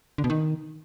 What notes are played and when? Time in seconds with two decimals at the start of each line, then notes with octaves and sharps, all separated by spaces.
0.18 D3
0.24 B2
0.30 D#3